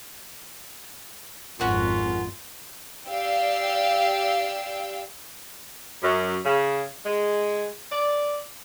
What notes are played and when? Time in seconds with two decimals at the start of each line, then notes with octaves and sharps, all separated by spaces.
1.60 G#1 F2 C#4 F4 F#4 A#4
3.08 G4 D5 F5 G5 E6
6.03 F#2
6.45 C#3
7.05 G#3
7.91 D5